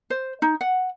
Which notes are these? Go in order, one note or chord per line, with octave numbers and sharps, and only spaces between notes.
C5
D#4
F#5